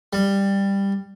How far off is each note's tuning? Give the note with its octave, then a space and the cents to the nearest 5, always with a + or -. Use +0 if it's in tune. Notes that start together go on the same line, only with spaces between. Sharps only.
G3 +10